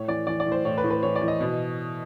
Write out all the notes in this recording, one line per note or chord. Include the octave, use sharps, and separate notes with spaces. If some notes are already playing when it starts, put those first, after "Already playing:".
Already playing: A2 C#5
E3 D5
E3 D5
D5
A2
C5
A2 C#5
B4
A2
B4
E3 C#5
D5
E3
D#5
B2